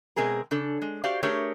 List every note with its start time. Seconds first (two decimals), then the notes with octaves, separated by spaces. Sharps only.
0.16 B2 G#3 C4 G#4 A#4
0.51 C#3 D4 A4
0.82 G#3
1.04 F#4 G4 C5 D5 F5
1.23 A3 D4 G4 G#4 A#4 C#5